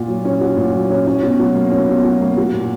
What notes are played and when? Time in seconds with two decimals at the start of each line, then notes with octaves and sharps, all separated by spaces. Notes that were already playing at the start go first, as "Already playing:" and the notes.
Already playing: A#2 F#4
0.08 F#3
0.25 C#4
0.41 F#4
0.57 A#2
0.74 F#3
0.90 C#4
1.07 C#4
1.23 B2
1.39 F#3
1.55 A#3
1.72 C#4
1.88 B2
2.05 F#3
2.21 A#3
2.38 F#4
2.54 A#2